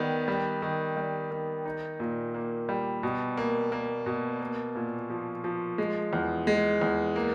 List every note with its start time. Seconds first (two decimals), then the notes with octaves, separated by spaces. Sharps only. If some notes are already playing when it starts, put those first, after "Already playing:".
Already playing: D#3 G3 B3
0.28 G3
0.62 D#3
0.97 G3
1.31 D#3
1.65 D#4
2.00 A#2
2.34 A#3
2.69 G3
3.03 B2
3.37 A#3
3.72 A#3
4.06 B2
4.41 A#3
4.75 A#2
5.10 F3
5.44 F3
5.78 G#3
6.13 E2
6.47 G#3
6.81 E2
7.16 A#3